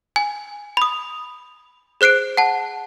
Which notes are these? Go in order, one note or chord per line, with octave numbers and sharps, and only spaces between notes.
G#5
B5 D#6
G#4 C5 F#6 C7 D7
F#5 A5